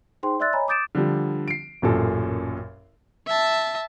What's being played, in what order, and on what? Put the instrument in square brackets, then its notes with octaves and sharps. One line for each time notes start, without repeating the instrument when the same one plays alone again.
[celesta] D#4 G#4 C5 G5 C6
D5 E5 C6 E6 F#6 A6
C#5 D#5 G#5 A#5 B5
D6 D#6 G6 A6 D7 E7
[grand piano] D3 F3 G3
C7 D7
A1 F#2 A#2 A4
[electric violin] E5 A5